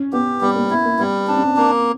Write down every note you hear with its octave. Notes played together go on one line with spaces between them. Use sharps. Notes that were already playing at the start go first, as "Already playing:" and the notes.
Already playing: C#4
B3 G4
G3 B3
A#3
B3 E4
A#3
G3 B3
C4 D4
C#4
C4
A#3 C4